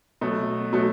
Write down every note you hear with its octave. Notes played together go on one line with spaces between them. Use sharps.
B2 F#3 A3
B2 F#3 A3